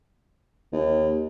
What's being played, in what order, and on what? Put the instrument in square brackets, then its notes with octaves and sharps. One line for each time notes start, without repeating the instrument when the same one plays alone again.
[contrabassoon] D#2